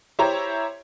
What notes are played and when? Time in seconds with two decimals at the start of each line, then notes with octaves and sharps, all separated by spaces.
0.19 E4 G4 C5 C#5 A#5